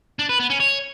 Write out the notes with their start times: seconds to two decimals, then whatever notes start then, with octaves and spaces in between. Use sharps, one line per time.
0.19 D4
0.29 B4
0.40 B3
0.50 C#4
0.60 C#5